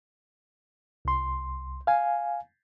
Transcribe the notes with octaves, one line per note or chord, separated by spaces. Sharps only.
C2 C6
F5 G#5